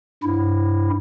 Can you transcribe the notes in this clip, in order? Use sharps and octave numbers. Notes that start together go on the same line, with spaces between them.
G2 E4